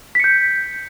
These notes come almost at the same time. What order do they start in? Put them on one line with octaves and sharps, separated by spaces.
B6 C#7 G6